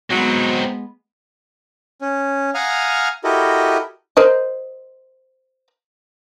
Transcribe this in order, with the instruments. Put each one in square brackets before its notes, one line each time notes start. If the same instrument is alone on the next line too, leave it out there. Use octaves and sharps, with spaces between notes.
[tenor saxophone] F#3 [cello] G#3 B3 [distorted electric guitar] C4 D#4
[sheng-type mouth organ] C#4
F5 F#5 G#5 A#5 D#6 F6
E4 F#4 G4 A4 A#4 D#5
[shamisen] A#4 C5 D#5